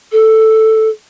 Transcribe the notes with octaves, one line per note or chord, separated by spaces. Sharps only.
A4